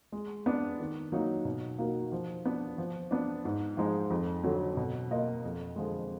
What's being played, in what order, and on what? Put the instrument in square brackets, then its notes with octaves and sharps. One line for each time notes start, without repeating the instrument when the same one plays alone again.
[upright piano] G#3
B3 D4
D#3
F#3 A#3 D#4
B2
A#3 D#4 F#4 A#4
F3
B3 D4
F3
B3 D4
G#2
F3 G#3 D#4
F2
D3 F#3
B2
A#3 F4 A#4 D#5
F2
D3 F3 G#3